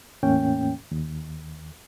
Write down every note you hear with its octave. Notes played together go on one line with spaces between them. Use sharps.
E2 A2 A#3 C#4 G5
D#2